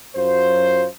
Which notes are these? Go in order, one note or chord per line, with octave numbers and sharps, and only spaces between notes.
F#2 F#3 F4 C5